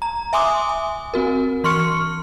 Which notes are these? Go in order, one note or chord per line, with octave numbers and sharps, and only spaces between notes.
A#5
E5 G#5 C6 D6 D#6
G#5
C4 F#4 A#4
E3 C6 C#6 F6 C#7